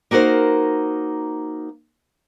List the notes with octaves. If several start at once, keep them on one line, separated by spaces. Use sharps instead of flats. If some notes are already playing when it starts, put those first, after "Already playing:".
A#3 D#4 F#4 A#4 C5